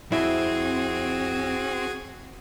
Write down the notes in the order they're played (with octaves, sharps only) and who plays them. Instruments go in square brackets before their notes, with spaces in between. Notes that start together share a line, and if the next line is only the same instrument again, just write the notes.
[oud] F2 [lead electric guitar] C4 [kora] E4 [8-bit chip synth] F#4 G#4 G#5